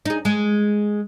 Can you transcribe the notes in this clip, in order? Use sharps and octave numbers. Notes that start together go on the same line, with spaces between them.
D#4 G#4
G#3